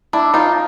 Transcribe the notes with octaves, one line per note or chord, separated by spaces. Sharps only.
D4 E4
D#4 F4